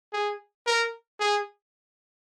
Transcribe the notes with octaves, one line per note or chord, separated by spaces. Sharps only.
G#4
A#4
G#4